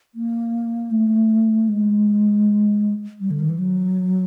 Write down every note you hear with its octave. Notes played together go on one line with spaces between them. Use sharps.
A#3
A3
G#3
G3
D3
D#3
E3
F#3